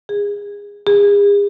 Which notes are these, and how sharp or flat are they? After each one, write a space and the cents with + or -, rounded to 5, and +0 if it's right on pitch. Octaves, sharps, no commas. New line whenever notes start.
G#4 -25
G#4 -40